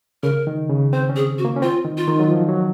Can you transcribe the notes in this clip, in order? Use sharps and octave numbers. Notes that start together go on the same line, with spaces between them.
C#3 A#4
D#3
C#3
C4 C5
C#4
G#4
F#4
A#3
C#4
C4 F4
D#3
F4
D#3
F#3
F3
F#3